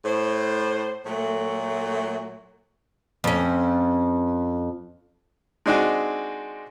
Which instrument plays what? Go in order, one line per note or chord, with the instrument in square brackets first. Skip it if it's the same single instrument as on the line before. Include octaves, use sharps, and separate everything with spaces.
[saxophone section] A2 C5
A#2 F#3 A3
[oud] F2 C#4
[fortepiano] G#3 C4 D4 D#4 F#4 G#4